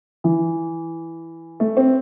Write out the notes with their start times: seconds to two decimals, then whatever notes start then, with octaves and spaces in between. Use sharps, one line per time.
0.24 E3
1.60 A3
1.77 C4